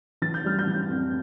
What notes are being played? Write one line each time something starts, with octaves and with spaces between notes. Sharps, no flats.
E3 A6
G6
G3 F6
G6
E3
F2